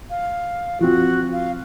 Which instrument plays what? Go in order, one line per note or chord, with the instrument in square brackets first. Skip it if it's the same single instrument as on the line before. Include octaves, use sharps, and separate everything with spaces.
[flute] F5
[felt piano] F3 C4 [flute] F#4
[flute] F5